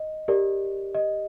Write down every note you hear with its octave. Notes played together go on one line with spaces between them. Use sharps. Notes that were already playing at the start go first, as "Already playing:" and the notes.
Already playing: D#5
G4 A#4 D5
D#5